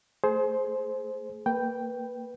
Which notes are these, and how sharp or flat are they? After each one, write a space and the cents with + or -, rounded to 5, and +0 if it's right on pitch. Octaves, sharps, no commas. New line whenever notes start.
A3 +10 G#4 +35 C5 +0
A#3 -20 B4 +0 G5 +0